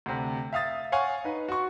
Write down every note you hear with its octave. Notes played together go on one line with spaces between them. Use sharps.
D2 C3
E5 F5 D#6 A6
C#5 F5 F#5 G#5 C#6
D#4 B4
F#4 C#6